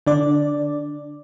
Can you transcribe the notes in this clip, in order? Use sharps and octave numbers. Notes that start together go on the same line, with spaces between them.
D3 D4 D5